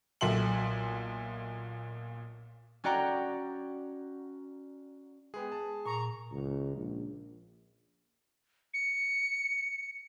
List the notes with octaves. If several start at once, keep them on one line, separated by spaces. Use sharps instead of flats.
B1 A#2 A4 E5 C6 F#7
C#4 F#4 D5 F#5 G5 A#5
G#3 B3 G#4 G5
A5
A#2 A#5 C#6
C#2
A#1
C#7